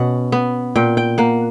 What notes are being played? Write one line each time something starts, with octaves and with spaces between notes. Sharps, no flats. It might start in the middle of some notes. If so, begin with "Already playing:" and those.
Already playing: B2 C#4 F#5
B3
A#2 G5
G5
A#3 F#5